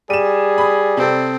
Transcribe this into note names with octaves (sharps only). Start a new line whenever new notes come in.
G3 G#4 D#7 E7
B5 D#6
C3 C4 A4